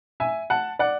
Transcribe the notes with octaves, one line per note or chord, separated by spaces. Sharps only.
E5 G#5
F#5 A5
D5 F#5